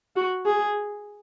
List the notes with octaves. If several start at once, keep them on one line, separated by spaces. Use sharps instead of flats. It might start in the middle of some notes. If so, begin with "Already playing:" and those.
F#4
G#4